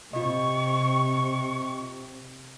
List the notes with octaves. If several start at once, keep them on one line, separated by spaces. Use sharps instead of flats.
C3 F4 D#5 C#6